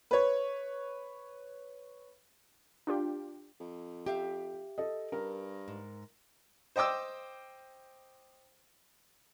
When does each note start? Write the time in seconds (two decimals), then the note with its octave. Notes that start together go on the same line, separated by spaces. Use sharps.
0.11 B4 C#5
2.87 D4 F4 G4
3.60 F2
4.06 G4 E5 F5 G5
4.78 A4 D#5
5.12 G2 A#4
5.68 G#2
6.76 C5 D#5 G5 D6 E6